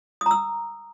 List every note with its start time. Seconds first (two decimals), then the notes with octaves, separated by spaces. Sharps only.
0.21 D#6
0.26 A#5
0.31 E6